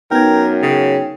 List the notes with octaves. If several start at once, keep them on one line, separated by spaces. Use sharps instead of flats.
F#2 B3 D#4 A#4 G5 G#6
C#3